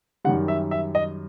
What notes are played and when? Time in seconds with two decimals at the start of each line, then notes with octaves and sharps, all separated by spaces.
0.24 F#2 D#3 G3 F#5
0.48 E5
0.71 E5
0.95 D#5